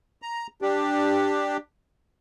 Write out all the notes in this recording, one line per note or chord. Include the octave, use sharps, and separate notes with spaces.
A#5
D4 G4